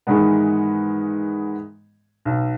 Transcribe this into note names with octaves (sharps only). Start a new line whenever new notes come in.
G#2 D#3 E3 G#3 B3
B1